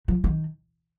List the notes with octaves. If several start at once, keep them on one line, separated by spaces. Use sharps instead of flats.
F3
D#3